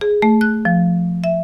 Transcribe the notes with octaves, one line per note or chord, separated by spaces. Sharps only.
G#4
A3
F#6
F3
E5